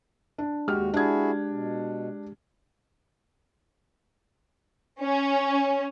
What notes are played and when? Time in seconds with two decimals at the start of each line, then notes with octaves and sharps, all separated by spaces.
0.38 D4
0.68 D#2 G#3 F#4 G4 F6
0.94 D4 E4 F#4 G#4 G#6
1.50 B2
5.01 C#4